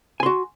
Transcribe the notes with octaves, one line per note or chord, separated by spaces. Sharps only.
F#4 G#5 C6